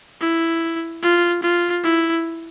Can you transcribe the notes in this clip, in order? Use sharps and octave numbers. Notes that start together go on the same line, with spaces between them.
E4
F4
F4
E4